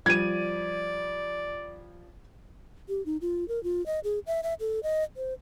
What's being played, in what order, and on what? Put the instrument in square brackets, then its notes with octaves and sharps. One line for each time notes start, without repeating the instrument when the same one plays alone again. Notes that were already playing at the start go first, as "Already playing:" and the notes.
[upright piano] F3 G3 [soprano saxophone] D5 [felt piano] G#6 D#7
[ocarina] G4
D#4
F4
A#4
F4
D#5
G#4
E5
E5
A4
D#5
C5